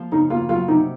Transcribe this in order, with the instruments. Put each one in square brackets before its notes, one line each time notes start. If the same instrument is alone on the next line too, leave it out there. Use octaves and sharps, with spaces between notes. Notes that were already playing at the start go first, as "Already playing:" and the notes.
Already playing: [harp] F3 A#3
[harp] C#3 [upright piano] D#4
[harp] A#3 [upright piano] F4
[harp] F#3 [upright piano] F4
[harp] C3 [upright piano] D#4